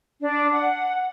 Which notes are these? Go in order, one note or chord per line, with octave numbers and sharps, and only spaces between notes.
D4
F#5